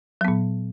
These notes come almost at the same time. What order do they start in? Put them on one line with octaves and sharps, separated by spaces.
F#3 B3 A#2